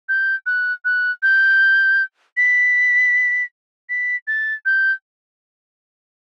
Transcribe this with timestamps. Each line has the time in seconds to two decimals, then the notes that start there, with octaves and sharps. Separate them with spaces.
0.09 G6
0.46 F#6
0.85 F#6
1.23 G6
2.37 B6
3.89 B6
4.28 A6
4.66 G6